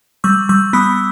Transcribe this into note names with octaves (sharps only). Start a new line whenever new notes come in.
G3 C#6 E6
G3 C#6 E6
B3 B5 D#6